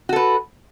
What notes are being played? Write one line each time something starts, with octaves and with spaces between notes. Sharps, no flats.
F#4 A4 B4